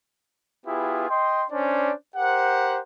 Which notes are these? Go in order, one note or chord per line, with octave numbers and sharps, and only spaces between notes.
B3 E4 F4 G4 G#4
D#5 G5 C6
C#4 D4 C5 D5
G4 A#4 C5 F#5